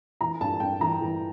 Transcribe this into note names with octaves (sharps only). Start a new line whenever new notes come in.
E3 A#5
G2 A5
G2 G5
E3 A#5
E3